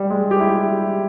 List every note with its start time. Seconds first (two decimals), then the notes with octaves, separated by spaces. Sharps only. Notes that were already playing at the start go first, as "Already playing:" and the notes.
Already playing: G3
0.10 G#3
0.31 G4
0.40 E4
0.49 G4